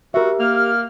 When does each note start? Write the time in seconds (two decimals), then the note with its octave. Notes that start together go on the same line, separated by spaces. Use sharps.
0.14 F#4 G4 A#4 E5
0.40 A#3 F6